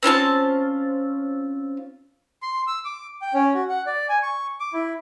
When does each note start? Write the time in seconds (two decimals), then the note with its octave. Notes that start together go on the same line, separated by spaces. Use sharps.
0.03 C4 C#4 F4 A5
2.42 C6
2.67 E6
2.85 D6
3.22 G5
3.34 C#4
3.54 F#4
3.70 F#5
3.86 D5
4.09 G#5
4.23 C#6
4.60 D6
4.73 E4